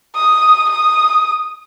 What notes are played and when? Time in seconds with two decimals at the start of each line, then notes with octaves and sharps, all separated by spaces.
0.16 D#6
0.70 D#6